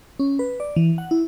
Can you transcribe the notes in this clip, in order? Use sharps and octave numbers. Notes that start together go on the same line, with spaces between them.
C#4
B4
D5
E3
F#5
E4